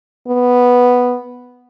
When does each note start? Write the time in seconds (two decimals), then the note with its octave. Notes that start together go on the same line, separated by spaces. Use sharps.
0.28 B3